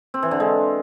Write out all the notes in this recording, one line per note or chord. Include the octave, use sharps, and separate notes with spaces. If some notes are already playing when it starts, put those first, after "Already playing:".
C4
E3
D3
G#3